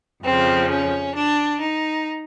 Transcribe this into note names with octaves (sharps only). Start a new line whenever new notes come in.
F2 C#3 F3 C4
C#4
D4
D#4